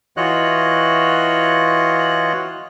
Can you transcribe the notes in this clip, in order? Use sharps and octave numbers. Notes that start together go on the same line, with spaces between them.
E3 F4 F#4 C#5 D#5 F#6